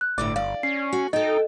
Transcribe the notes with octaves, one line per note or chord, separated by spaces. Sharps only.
F#6
G1 D2 A2 D5 D6
D5 F5
C#4 C7
F#4
D#4 A4 D#5 G5